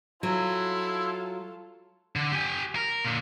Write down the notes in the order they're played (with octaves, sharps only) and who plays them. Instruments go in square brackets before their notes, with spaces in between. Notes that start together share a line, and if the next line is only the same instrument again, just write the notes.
[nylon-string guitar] F#3 [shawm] E4 [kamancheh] F4 A4
[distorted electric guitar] D3
G4 G#5
A#4
A#2 D3